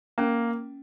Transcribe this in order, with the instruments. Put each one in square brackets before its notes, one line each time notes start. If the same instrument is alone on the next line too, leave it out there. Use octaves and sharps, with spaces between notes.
[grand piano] A#3 [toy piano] C#4